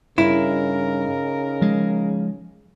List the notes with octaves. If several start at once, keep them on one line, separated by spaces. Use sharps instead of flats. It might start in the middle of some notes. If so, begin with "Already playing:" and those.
G2 C#3 D#4 E4 A#4
F3 G#3